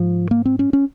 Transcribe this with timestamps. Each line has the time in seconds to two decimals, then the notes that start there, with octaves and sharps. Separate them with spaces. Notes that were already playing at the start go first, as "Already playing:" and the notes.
Already playing: G#2 F3
0.31 A#3
0.45 C4
0.59 C#4
0.73 C#4